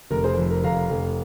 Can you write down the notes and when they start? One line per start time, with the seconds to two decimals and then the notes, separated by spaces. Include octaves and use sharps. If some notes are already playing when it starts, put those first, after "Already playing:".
0.11 F1 A#4
0.24 G#4 C5
0.38 F2
0.50 A#4
0.64 F1 F5 A#5
0.90 F1